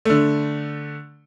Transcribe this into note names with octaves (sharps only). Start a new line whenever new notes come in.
D3 A3